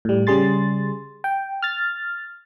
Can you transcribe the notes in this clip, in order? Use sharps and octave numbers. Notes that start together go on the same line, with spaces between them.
A2 G3
C#3 G3 G#4 C6 A6
G5
F6 A6